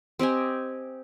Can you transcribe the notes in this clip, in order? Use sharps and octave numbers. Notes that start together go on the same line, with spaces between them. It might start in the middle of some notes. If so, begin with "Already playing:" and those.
C4 G4 D#5 G#5